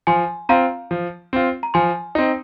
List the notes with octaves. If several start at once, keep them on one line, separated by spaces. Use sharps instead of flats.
F3 G#5 C6
C4 F4 F5 A#5
F3
C4 F4
A#5
F3 G#5 C6
C4 D#4